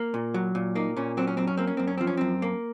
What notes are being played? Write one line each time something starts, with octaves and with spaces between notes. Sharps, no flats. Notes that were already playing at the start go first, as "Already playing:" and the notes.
Already playing: A#3
A#2
F#3
A#2
A#3 D#4
A#2 C#4
F#3 C4
C#4
F#2 C4
C#4
A#3 C4
C#4
F#2 C4
C#4
F3 C4
C#4
F#2 C4
A#3